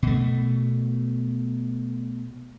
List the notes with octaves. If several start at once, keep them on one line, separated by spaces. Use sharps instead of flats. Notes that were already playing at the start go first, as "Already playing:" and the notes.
B2 A3